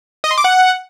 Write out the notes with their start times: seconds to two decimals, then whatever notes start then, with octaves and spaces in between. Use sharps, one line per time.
0.24 D#5
0.31 C6
0.38 D6
0.44 F#5